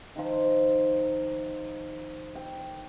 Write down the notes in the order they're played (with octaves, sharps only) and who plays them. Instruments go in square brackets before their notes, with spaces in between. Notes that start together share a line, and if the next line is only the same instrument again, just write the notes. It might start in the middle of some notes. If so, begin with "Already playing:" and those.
[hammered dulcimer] D#3 F3
G5